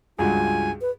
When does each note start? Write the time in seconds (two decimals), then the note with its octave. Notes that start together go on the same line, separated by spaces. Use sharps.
0.19 C#2 G2 F4 F#4 G#5
0.81 B4